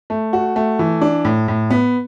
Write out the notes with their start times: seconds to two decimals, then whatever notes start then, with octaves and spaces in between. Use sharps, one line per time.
0.10 A3
0.33 F#4
0.56 A3
0.79 E3
1.01 D4
1.25 A2
1.48 A2
1.70 B3